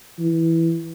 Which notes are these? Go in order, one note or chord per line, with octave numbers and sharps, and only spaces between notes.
E3